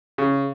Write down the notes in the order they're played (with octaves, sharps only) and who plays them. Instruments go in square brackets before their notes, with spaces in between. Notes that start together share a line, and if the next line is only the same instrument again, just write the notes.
[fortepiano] C#3